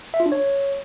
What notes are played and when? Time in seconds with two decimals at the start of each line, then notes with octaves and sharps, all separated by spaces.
0.14 E5
0.20 F4
0.26 D4
0.32 C#5